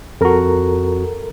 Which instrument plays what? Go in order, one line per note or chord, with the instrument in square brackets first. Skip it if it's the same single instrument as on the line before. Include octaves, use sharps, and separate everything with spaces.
[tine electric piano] F2 F#4 [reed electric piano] A4 A#4 A#5